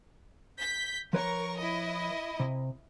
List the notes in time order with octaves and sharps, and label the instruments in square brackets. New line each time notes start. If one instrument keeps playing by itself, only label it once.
[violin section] G6 B6
[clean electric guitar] F3 B4 C#5 [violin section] A#4 C#6
[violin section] E4 D#5
[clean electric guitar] C3